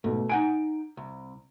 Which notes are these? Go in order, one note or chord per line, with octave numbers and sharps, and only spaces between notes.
G#2 B2 A3
D#4 F#5 G#5 D7
C2